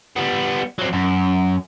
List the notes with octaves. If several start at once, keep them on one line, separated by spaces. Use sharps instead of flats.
G3 B3
F#3 C4
F#2